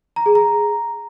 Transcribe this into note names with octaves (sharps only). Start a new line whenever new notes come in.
A#5
G#4
A#5